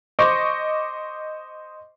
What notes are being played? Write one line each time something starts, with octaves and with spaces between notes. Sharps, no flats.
C5 D#5 C#6 D6